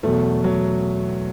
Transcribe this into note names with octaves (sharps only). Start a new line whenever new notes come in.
E2 B2 F#3 A3
F#3